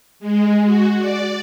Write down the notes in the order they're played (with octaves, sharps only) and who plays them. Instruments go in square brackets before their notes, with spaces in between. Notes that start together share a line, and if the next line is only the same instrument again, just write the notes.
[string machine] G#3
F#4
D5